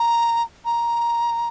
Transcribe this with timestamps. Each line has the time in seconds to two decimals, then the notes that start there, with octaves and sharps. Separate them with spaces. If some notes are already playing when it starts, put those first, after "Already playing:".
Already playing: A#5
0.65 A#5